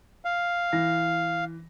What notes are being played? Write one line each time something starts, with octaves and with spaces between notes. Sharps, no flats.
F5
E3 A#6